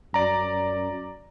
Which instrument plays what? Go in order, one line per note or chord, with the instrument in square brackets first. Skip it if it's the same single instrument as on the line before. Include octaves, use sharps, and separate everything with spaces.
[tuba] F#2 [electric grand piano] D5 A#5